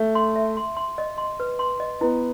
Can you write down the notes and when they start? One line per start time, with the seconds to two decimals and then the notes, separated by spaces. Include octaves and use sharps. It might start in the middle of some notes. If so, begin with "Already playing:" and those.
Already playing: A3
0.15 C6
0.36 E5
0.57 C6
0.77 C6
0.98 D#5
1.18 C6
1.40 B4
1.59 C6
1.80 D#5
2.01 B3 E4